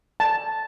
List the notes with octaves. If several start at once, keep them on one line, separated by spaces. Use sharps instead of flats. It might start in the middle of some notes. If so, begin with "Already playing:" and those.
A5